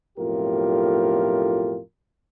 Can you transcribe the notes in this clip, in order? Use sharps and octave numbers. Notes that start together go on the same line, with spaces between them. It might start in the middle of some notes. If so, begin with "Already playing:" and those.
B1 F2 A2 F4 G4 A#4